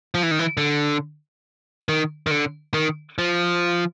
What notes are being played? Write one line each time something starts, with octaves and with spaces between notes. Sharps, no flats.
F3
E3
D#3
E3
D3
D#3
D#3
D3
D#3
F3